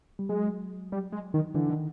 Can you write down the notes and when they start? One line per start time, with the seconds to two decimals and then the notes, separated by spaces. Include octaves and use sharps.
0.19 G3
0.29 F#3 G#3
0.92 G3
1.12 G#3
1.34 D#3
1.54 D3 E3
1.70 D#3